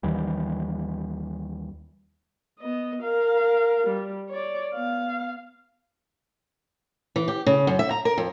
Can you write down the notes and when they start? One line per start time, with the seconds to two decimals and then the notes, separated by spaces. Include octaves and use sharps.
0.03 D#2 D#3 E3 G3
2.59 B3 D#5
3.02 A#4 F5
3.87 G3
4.29 C#5 D5
4.75 B3 F5
7.16 E3
7.28 G4
7.46 C#3
7.67 F#2
7.79 E5
7.91 A#5
8.05 A#4
8.18 F2